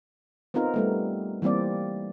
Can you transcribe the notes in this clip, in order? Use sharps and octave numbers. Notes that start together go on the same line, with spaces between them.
B3 C4 D#4 F4 A#4
G3 A3 B3
E3 G3 A#3 C4 D5